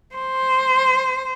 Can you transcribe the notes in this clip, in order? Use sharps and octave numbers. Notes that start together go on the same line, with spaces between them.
C5